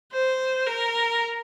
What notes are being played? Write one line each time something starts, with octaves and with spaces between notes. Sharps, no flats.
C5
A#4